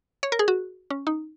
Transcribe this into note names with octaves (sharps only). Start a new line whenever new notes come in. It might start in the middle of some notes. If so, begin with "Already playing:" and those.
C#5
A#4
G#4
F#4
C#4
D#4